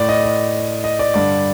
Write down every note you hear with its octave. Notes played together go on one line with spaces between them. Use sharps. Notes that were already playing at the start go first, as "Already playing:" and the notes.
Already playing: A2 D5
D#5
D#5
D#5
D5
G2 D3 D5